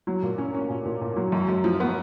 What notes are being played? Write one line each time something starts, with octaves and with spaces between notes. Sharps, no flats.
F#3
A#2
C#4
C#4
A#2
A#2
A#2
F#3
F#2
F#2
F3
B3